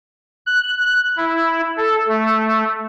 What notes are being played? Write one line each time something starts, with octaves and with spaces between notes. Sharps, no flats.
F#6
E4
A4
A3